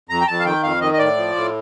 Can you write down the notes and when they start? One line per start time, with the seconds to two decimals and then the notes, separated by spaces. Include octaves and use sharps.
0.09 F2 A#5
0.21 G5
0.28 F2 A5
0.40 F5
0.45 D#3 G5
0.63 F2 F5
0.81 D#3 D#5
0.94 D#5
0.99 A2 D5
1.16 F3
1.35 A2